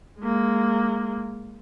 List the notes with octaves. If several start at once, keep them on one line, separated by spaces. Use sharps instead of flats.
G#3 A#3